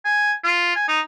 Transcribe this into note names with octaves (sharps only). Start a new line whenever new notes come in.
G#5
F4
G#5
D#4